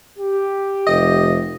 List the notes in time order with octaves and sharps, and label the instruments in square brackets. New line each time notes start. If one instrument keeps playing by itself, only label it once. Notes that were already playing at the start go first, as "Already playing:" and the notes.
[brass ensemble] G4
[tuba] F1 [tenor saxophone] D#5